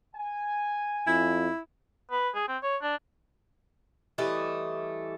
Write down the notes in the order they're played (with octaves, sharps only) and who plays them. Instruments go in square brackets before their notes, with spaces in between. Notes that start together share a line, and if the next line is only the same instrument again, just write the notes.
[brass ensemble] G#5
[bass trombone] F2 [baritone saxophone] E4
[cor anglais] B4
G#4
C4
C#5
D4
[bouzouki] E3 G3 A3 D#5